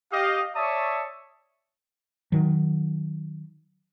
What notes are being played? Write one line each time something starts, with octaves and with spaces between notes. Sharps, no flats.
G4 D#5 F5
C#5 D5 E5 A5 C#6 D#6
D#3 F#3